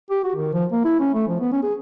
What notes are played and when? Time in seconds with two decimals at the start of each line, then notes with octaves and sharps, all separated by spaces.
0.11 G4
0.24 F#4
0.35 D#3
0.53 F3
0.72 A#3
0.85 E4
1.00 C#4
1.14 A3
1.28 F3
1.40 B3
1.52 C#4
1.63 G#4